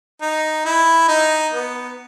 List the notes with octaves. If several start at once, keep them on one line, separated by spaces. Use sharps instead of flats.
D#4
E4
D#4
B3